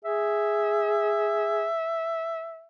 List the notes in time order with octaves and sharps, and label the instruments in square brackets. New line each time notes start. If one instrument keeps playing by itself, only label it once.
[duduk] G#4 [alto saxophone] E5